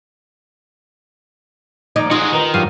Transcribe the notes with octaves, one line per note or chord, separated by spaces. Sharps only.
D#2 F3 D#4 D5 G#6
G#3 D#4 F4 F#4
D#3 B4 A#5 A#6
G2 F3 F#3 F6 C7 D#7